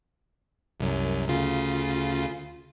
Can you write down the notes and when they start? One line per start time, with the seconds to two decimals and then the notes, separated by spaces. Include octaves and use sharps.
0.80 C2 F#2
1.28 D2 C#3 F4